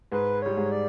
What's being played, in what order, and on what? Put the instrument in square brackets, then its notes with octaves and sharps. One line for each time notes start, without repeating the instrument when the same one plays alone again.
[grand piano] G#2 G#3 [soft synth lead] B4
[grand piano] G3 [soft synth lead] C#5
[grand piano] G#2 G#3
[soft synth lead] D5